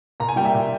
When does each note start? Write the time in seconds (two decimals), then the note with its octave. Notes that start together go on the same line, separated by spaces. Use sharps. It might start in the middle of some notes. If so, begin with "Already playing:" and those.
0.20 A#2 A#5
0.29 G#5
0.36 G3 G5
0.45 E5
0.54 A#2